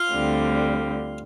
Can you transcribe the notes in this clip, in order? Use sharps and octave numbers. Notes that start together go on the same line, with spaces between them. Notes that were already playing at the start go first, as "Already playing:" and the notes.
Already playing: F4
D2 D3 G3 C4